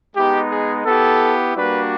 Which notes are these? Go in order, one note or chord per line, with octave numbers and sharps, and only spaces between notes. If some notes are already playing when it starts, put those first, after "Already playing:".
G#3 B3 D#4 G4
G#4
B3 E4 G4 A4
G3 A#3 D4 F#4 B4